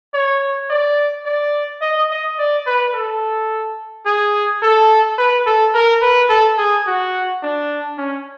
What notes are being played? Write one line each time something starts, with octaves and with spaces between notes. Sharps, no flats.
C#5
D5
D5
D#5
D#5
D5
B4
A4
G#4
A4
B4
A4
A#4
B4
A4
G#4
F#4
D4
C#4